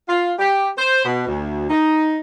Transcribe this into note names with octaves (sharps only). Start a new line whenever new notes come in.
F4
G4
C5
B2
D2
D#4